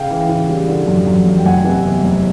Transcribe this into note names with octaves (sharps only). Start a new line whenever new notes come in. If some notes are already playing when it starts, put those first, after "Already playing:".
Already playing: C#3 F5 G5
E3
C#3
G3
D3
F#2
F#2
F#2
G5
F#1 F#5 G#5
C3
E2
F#1